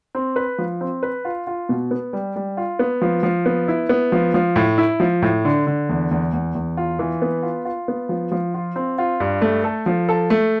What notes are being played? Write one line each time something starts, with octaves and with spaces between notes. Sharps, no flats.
C4
B4
F3
C4
B4
F4
F4
B2
B3
G3
G3
F4
B3
F3
F3
B3
E4
B3
F3
F3
A2
E4
F3
A2
D3
D3
E2
E2
E2
E2
F4
E3
B3
F4
F4
B3
F3
F3
F4
C4
F4
G2
A3
A4
F3
A4
A3